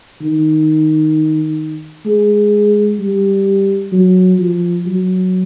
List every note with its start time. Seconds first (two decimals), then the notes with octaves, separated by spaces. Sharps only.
0.21 D#3
2.06 G#3
3.00 G3
3.92 F#3
4.39 F3
4.87 F#3